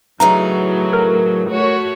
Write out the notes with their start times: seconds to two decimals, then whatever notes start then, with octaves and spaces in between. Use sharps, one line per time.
0.20 A2 C#3 E3 F#3 A3 D#4 A#5
0.93 A#4
1.50 A3 F#4 C#5